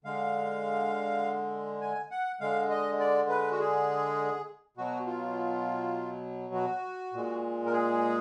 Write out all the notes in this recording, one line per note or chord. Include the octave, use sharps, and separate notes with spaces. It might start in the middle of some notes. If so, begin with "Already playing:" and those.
D3 G#3 F5
G#5
F#5
D3 G#3 F5
D#5
D5
B4
F#4
G#4
B2 F#3 F#4
F4
F#4
A#2 G#3
A#4
G#4